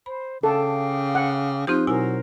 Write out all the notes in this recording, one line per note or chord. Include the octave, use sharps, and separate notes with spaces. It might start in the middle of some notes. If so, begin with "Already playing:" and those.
C5 B5
C#3 A4 F5 G5 D6
F#5
F3 C4 D#4 G4 F#6
B2 F#3 E4 A#4 C5 G#5